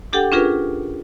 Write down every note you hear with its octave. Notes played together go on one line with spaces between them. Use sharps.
D4 G4 A4 F#5 G5 D6
C#4 D4 F4 G#4 A#4 B4